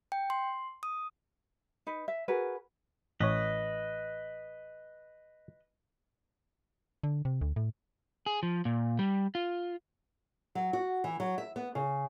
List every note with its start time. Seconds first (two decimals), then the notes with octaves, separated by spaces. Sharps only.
0.12 G5
0.30 C6
0.83 D#6
1.87 D#4 B4
2.08 E5
2.28 F#4 G#4 A#4 B4
3.20 A1 B4 C#5 D#5
7.03 D3
7.25 C3
7.41 D2
7.56 A2
8.26 G#4
8.43 F3
8.65 A#2
8.99 G3
9.35 F4
10.55 F#3
10.73 F#4
11.04 E3
11.20 F#3
11.38 E5
11.56 B3
11.75 C#3